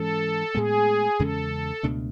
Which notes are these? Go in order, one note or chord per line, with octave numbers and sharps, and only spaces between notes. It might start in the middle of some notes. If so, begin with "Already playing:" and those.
Already playing: G#2 E3 G#3 C#4 A4
A2 G#3 B3 G#4
E2 C#3 G#3 C#4 A4
C#2 B2 A3 D4